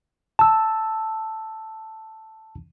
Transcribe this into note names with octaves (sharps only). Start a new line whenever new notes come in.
A5 E6